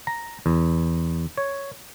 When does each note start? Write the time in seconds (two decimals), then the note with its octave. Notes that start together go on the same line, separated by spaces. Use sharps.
0.07 A#5
0.46 E2
1.38 C#5